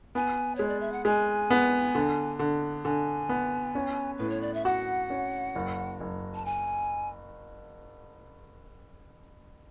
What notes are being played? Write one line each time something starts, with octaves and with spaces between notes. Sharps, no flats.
B3 G#5
G#3 C#5
D5
E5
F#5
G#3 G#5
B3
D3
D3
D3 G#5
B3
C#4
A2 B4
C#5
D5
E5
F#4 F#5
C#4
F#1
F#1
A5
G#5